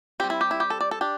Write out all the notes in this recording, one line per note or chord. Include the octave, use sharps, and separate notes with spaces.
G3 C4 G4
E4
G4
E4
G4
A4
D5
A4
D4 G4